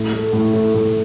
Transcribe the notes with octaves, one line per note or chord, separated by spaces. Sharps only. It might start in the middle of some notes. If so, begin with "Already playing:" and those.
Already playing: A2
A3
A2
A2
A2